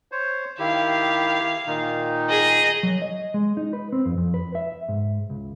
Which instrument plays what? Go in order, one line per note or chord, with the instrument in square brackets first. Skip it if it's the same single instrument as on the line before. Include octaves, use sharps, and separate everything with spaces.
[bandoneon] C5 C#5
[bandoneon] D#3 E4 G4 [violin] F5
[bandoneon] A#2 D#3 D#4
[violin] G#4 D#5
[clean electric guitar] F#3
D#5
G#3
D#4
B4
C4
F2
F2
B4
E5
G#2
C#2